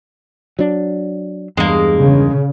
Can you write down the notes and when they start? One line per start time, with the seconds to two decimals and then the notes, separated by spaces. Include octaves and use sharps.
0.59 F#3 D4
1.57 E2 G2 G#3 A#3
1.98 C#3